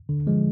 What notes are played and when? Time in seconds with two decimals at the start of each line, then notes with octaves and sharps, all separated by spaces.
0.09 D3
0.27 F3 G#3